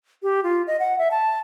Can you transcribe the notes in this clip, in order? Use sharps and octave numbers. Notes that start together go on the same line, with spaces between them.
G4
F4
D#5
F#5
E5
A5